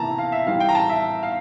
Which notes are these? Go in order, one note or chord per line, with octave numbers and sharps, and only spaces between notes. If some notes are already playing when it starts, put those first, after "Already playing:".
Already playing: C3 E3 A#3 A5 A#5
F5
E5
E3 G3 C4 F5
G5
A#5
A5
E5
F5